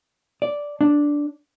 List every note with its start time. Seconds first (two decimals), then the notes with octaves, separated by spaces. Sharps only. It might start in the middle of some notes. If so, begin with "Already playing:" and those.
0.42 D5
0.81 D4